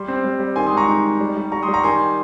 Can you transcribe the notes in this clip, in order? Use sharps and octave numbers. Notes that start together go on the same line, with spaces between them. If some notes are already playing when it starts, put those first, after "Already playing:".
Already playing: G3 C6
C4
G3
G3
D#3 G#5 C6
C6 D#6
G#3 A#5 C#6
D#4
D#4
G3
G3
G3 A#5 C#6
C6 D#6
G3
A#5 C#6
D#3 G#5 C6